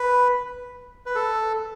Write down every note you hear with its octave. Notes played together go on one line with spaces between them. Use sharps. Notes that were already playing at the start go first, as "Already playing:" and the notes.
Already playing: B4
B4
A4